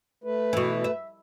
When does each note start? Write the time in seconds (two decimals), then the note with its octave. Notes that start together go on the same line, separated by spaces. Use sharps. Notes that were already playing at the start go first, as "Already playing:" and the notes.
0.24 A3 B4
0.53 B2 E3
0.84 E5